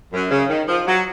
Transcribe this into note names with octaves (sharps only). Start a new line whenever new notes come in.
F#2
C#3
D#3
F3
F#3